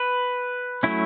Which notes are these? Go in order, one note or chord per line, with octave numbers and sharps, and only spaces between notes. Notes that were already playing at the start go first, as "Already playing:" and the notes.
Already playing: B4
F#3 A3 C#4 E4